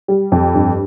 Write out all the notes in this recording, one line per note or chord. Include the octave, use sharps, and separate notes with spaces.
G3
F2
G2